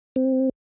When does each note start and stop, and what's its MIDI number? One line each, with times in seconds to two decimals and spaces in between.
0.16 0.49 60